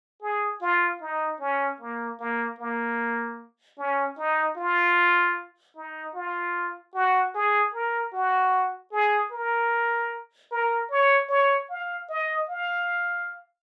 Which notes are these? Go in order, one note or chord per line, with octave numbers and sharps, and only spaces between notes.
G#4
F4
D#4
C#4
A#3
A#3
A#3
C#4
D#4
F4
D#4
F4
F#4
G#4
A#4
F#4
G#4
A#4
A#4
C#5
C#5
F5
D#5
F5